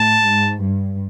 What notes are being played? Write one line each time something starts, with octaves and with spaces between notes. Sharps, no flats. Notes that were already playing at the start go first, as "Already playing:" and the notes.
Already playing: A2 A5
G#2
G2